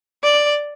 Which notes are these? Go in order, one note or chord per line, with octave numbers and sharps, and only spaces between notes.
D5